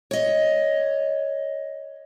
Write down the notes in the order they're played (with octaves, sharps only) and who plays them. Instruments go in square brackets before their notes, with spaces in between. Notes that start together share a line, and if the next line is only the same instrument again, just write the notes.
[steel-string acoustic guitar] C#5 D#5